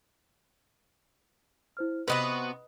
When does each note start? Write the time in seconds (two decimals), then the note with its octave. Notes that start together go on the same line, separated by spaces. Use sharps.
1.77 E4 C5 F6
2.08 C3 B3 F#4 B4 D#5 F#5 B5